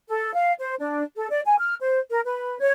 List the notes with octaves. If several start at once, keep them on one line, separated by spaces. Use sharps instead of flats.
A4
F5
C5
D4
A4
D5
G#5
F6
C5
A#4
B4
C#5